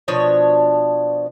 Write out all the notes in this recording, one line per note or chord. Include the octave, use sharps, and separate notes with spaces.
B2 F3 D4 C#5